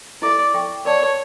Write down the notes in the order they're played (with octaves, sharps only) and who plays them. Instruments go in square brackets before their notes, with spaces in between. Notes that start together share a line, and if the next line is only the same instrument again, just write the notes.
[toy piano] E4 A4 E5 [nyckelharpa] D5
[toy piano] A4 E5 G5 C#6
[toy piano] A#4 D5 A5 [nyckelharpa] C#5